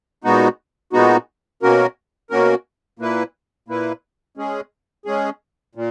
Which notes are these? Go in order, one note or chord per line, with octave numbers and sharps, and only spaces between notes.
A#2 G#3 B3 D#4 F#4
A#2 G#3 B3 D#4 F#4
B2 A#3 C#4 F#4 A#4
B2 A#3 C#4 F#4 A#4
A#2 A#3 E4 B4
A#2 A#3 E4 B4
G#3 C#4 G#4
G#3 C#4 G#4
A#2